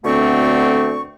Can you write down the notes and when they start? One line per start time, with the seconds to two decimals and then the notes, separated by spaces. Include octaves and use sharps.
0.05 D2 B2 D3 A3 C4 C#6